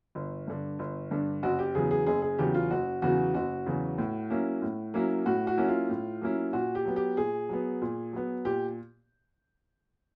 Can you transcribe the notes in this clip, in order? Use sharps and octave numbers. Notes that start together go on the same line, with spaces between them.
G1
G2 D3
G1
G2 D3
F#1 F#4
G4
E2 C#3 F#3 G#4
G#4
F#1 G#4
G#4
E2 C#3 F#3 G4
F4
F#1 F#4
E2 C#3 F#3 F#4
F#1 F#4
E2 C#3 F#3
A2
F#3 A#3 C#4 E4
A2
F#3 A#3 C#4 E4
A2 F#4
F#4
F#3 A#3 C#4 E4
F4
A2
F#3 A#3 C#4 E4
A#2 F#4
G4
F#3 B3
G4
A#2 G#4
F#3 B3
A#2
F#3 B3
A#2 G4